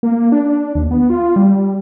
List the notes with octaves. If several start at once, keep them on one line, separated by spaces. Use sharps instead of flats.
A#3
D4
D#2
B3
F4
G3